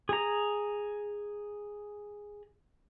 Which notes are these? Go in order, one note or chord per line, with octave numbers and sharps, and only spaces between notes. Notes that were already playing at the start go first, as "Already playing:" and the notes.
G#4 A#5